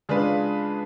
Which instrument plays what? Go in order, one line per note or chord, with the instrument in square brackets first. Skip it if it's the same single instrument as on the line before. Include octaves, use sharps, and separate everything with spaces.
[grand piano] C#3 G#3 D4 F4 B4